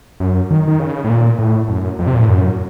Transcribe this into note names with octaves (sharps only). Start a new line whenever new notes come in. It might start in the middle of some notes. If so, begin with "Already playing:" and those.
F#2
D#3
D#3
C#3
A2
A#2
A2
F#2
F2
C3
A#2
A2
F#2